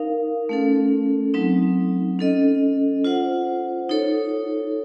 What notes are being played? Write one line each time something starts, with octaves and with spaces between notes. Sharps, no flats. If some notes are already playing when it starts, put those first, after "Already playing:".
Already playing: D#4 A#4 F5
A3 C#4 A4
F#3 C4 D#4
C#4 A4 D#5
F4 C5 F#5
D#4 A4 C#5